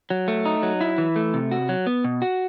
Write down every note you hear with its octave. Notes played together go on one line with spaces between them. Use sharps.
F#3
A3
D#4
F#3
E4
E3
A3
C3
F#4
F#3
B3
B2
F#4